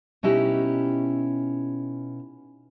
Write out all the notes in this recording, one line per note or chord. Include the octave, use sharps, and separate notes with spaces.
B2 C#4 D#4 E4 G4